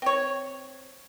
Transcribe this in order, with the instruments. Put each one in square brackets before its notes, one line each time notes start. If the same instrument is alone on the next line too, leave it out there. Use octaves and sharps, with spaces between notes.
[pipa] C4 C#5